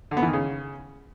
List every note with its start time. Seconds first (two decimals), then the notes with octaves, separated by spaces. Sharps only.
0.11 D3
0.17 B3
0.22 E3
0.28 D#3
0.33 C#3